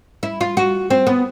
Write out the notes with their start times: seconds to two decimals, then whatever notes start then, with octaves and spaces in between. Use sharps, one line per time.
0.23 E4
0.41 F4
0.57 F#4
0.90 C4
1.07 B3